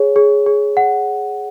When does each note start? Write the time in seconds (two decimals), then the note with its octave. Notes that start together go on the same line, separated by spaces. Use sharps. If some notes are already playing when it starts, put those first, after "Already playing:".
Already playing: G#4 C#5
0.16 G#4
0.46 G#4
0.77 F#5